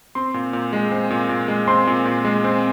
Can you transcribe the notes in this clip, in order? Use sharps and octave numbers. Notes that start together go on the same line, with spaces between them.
C4 C6
A#2
A#2
G#3
C4
A#2
A#2
G#3
C4 C6
A#2
A#2
G#3
C4